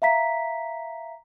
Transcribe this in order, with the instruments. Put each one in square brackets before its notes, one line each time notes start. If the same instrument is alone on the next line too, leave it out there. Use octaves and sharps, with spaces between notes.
[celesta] E5 F5 A#5 B6